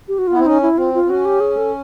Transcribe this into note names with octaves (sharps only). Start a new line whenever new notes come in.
G4
F#4
F4
B3
C4 E4
C#4 D#4
E4
C4 F4
F4
C4
C#4 F#4
G4
G#4
A4